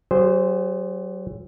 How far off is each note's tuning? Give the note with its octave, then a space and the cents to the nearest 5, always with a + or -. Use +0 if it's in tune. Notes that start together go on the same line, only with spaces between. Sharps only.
F#3 +30 G#4 -30 C5 -5